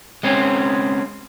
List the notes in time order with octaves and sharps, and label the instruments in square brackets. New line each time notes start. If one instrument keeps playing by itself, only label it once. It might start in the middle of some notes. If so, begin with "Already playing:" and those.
[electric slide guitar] G#3 C4 C#4